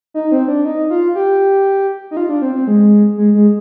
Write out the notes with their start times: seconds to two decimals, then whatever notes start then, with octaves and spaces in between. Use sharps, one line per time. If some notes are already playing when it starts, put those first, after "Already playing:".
0.14 D#4
0.32 C4
0.48 D4
0.65 D#4
0.90 F4
1.15 G4
2.11 D#4
2.17 F4
2.29 D4
2.42 C4
2.55 C4
2.67 G#3
3.18 G#3
3.35 G#3